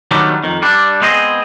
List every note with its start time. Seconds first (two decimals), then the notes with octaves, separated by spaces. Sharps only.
0.11 D#3 F#3 G3 A3 B3 D4
0.44 F2 D#3
0.62 G3 D4
1.01 G#3 B3 C4 G#4 C5 D#5